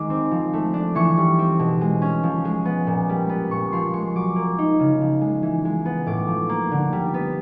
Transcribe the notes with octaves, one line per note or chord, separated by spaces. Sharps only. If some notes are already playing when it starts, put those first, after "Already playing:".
Already playing: D#3 G#3 D6
C4
F3
A3
D4
E3 C#6
G3
C4
B2
G#3
C#4
F3
G#3
B3
A#2
G3
B3
A#2 C#6
F3 C6
G#3 C#6
F#3 D6
A#3
D#4
C#3
F3
G#3
E3
G#3
B3
A2 D6
F3
A#3
D3
G3
B3